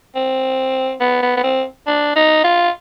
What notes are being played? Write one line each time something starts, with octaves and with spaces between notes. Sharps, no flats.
C4
B3
B3
B3
C4
D4
D#4
F4